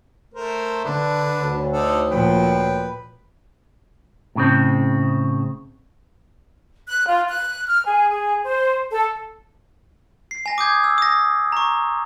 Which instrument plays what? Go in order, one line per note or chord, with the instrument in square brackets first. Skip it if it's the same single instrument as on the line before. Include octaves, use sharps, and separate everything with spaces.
[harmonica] A3 A#4 C5
[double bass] D3 [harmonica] D4 B4
[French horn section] D2 C#5
[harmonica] D3 D#4 A4
[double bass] A#2 F3 [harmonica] B4 G5
[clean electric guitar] A2 C#3 C4
[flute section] F#6
F4
F#6
F6
G#4
G#4
C5
A4
[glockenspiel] C7
G#5 A#6
D6 D#6 G6 G#6
E6
D#6 A#6
A#5 C#6